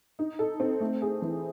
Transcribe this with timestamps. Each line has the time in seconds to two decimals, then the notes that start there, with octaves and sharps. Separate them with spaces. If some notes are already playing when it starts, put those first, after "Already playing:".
0.19 D#4
0.39 A4
0.60 C4
0.80 A3
1.02 G#4
1.22 E3